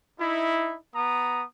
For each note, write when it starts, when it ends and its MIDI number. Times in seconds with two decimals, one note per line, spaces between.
0.19 0.76 63
0.19 0.76 64
0.95 1.43 59
0.95 1.43 82
0.95 1.43 87